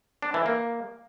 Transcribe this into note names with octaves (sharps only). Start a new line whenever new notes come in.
D4
E3
A#3